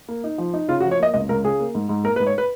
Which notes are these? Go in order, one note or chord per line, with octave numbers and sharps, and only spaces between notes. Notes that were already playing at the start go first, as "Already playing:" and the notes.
A#3
D#4
F3
D#4
C#3 F4
F#4
F3
C#5
A#3 D#5
C#2 D#5
C#2 A#4
C#3 G#4
A#3
G#2
G#2
A#3 A#4
B4
G#2
C#5
B4